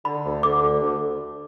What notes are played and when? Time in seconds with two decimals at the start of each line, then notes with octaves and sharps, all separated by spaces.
0.05 D3 B5
0.25 D2
0.43 D3 D6
0.62 D2
0.81 D2